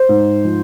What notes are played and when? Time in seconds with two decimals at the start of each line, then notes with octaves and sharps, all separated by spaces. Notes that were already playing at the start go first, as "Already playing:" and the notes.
Already playing: C5
0.09 G#2
0.45 F3